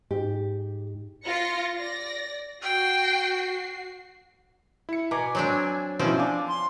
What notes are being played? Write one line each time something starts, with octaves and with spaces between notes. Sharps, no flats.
G#2 G4
F4 A#6 C#7
D5 A#6
F#4 G5 C7
E4 C#7
B2 G#5 A#5 D6
F#3 C4 D4
B2 F3 C4 C#4 E4
D4 F5 G#5 D6
C6